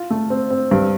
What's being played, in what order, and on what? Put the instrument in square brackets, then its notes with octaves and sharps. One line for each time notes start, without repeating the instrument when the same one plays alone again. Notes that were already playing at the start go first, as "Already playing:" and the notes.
Already playing: [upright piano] F4
A3
C4
C4
[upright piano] G2 [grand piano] G3